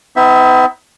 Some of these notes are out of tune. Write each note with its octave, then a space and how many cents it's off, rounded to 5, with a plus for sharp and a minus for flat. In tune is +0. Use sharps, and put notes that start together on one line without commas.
B3 +45 D#4 +45 E5 +0